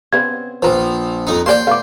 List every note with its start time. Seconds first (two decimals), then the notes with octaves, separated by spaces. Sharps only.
0.13 C#3 B3 C4 G#6
0.62 A#1 F3 B4 A#5
1.27 F2 D#4
1.46 A#3 C5 D5 G5 C6
1.67 A3 B3 F5 D6